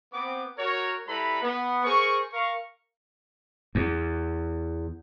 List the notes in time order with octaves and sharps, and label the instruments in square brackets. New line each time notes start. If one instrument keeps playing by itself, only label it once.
[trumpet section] B3 C4 D6
F#4 A#4 C#5
G3 E4 A4 B4 A#5 B5
B3
G#4 A#4 C5 C#6
A#4 F5 C#6
[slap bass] E2